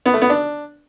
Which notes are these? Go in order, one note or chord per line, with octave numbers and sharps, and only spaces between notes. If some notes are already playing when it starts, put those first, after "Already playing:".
B3
A3
B3
D4